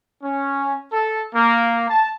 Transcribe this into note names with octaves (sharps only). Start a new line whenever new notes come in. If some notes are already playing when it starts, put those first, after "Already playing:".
C#4
A4
A#3
A5